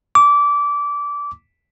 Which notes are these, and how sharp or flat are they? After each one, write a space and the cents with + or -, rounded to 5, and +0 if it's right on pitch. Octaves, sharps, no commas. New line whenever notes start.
D6 -20